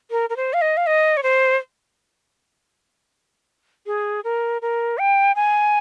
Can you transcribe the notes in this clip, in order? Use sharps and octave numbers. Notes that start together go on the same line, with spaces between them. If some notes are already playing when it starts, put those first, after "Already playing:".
A#4
A#4
C5
F5
D#5
F5
D#5
C#5
C5
G#4
A#4
A#4
G5
G#5